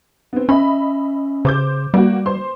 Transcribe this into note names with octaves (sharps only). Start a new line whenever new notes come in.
B3 C4
C#4 D#5 E5 B5
C#3 C5 D6 G6
G3 A#3 F#4
C5 C6